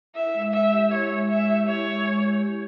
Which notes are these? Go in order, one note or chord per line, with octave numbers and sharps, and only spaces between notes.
E4 E5
G#3
G#3 E5
G4
E4 C#5
G#3
G#3 E5
G4
E4 C#5
G#3
G#3
G4
E4